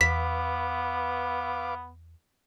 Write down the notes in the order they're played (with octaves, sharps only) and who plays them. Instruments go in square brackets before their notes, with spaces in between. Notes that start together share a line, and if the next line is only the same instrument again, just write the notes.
[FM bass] E2 [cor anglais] B3 [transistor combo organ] B4 F5 D6 [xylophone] B6